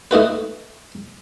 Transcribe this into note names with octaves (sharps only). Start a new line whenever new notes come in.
A3 D#4 F#4 B4